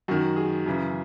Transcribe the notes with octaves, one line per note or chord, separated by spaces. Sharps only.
F#2 D#3 F#4
G#4
F#2 C#3 E3